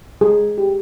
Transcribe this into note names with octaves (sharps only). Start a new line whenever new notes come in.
G#3 G#4
G4